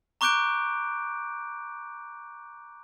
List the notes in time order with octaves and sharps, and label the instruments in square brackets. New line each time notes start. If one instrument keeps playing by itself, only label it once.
[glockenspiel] A#5 C#6 D6 F#6 G6 D7